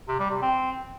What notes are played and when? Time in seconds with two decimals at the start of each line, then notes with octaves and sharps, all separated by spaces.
0.08 C3
0.19 G3
0.30 C3
0.42 C4